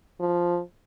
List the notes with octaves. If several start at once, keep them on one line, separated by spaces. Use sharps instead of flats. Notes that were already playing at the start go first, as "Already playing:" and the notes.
F3